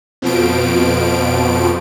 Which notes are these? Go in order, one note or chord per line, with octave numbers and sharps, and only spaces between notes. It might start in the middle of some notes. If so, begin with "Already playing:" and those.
F2 B2 F3 D7